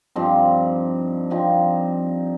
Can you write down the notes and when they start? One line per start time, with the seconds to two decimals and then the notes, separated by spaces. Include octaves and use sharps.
0.15 G2 F3 C4 D#4
1.30 G2 F3 C4 D#4